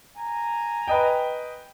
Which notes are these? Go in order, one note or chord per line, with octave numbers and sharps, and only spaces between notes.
G#5 A#5
B4 D#5 G5